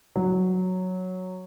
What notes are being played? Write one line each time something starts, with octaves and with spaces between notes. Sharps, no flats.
F#3